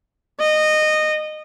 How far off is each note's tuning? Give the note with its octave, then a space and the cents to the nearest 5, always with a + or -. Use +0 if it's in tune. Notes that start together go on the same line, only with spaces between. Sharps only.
D#5 -15